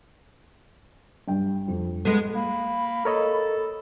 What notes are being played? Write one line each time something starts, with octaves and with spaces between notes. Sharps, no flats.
G2 G5
F2
G#3 B3 A4
A#3 B5
A4 A#4 C#5 D#5